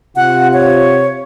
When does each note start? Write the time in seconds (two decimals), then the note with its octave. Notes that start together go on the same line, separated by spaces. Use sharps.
0.16 C3 F4 F#5
0.53 C#5